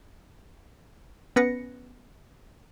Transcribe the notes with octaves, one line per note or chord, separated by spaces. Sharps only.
B3 C#4 B4 A#6 C#7